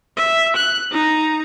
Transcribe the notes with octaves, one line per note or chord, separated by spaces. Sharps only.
E5
F#6
D#4 A#5